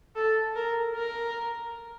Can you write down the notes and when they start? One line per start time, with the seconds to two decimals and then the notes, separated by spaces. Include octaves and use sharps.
0.16 A4
0.56 A#4
0.95 A#4